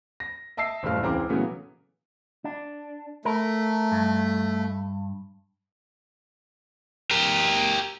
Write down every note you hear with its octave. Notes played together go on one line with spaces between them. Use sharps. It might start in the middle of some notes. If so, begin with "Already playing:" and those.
A#6
D#5 E5 A5 E6 C7
F#1 D#2 A2 G3 F5 F6
E1 C#2 E3 C4 A#5 D6
A#2 C#3 E3 F#3 A3 B3
D4
A3 A#4
G2
G4 A#4